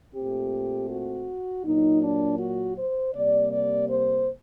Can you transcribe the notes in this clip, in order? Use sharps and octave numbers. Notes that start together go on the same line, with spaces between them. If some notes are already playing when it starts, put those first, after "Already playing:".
A#2 A3 C4 G4
F#4
A#2 F#3 A#3 D#4
D4
F#4
C5
C3 G3 A#3 D5
D5
C5